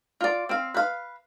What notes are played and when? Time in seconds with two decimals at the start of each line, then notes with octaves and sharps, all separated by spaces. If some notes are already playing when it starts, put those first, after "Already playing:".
0.21 F4 D5
0.49 C4 F5
0.74 B4 F5